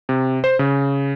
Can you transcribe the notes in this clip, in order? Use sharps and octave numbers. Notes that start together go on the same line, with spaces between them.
C3
C5
C#3